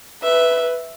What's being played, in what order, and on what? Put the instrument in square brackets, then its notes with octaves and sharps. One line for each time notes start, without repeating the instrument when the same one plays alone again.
[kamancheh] B4 [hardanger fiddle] E5